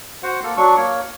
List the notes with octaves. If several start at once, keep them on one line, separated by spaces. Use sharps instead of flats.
F#4 C5 F#5
A#3 A4
F#3 D4 C#6
A#3 C#5